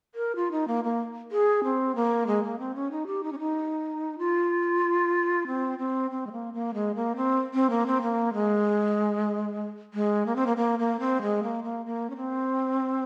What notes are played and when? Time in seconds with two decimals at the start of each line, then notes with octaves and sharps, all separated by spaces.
0.15 A#4
0.36 F4
0.52 D#4
0.68 A#3
0.84 A#3
1.32 G#4
1.64 C4
1.96 A#3
2.27 G#3
2.44 A#3
2.59 C4
2.75 C#4
2.91 D#4
3.07 G4
3.24 D#4
3.33 C#4
3.39 D#4
4.19 F4
5.47 C4
5.79 C4
6.11 C4
6.27 G#3
6.32 A#3
6.54 A#3
6.74 G#3
6.95 A#3
7.16 C4
7.54 C4
7.70 A#3
7.87 C4
8.02 A#3
8.33 G#3
9.94 G#3
10.26 A#3
10.36 C4
10.46 A#3
10.57 A#3
10.79 A#3
11.00 C4
11.22 G#3
11.43 A#3
11.64 A#3
11.86 A#3
12.10 C#4
12.17 C4